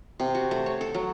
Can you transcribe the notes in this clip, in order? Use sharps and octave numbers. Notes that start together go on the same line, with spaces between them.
C3
F#4
A3
C#5
A4
F#3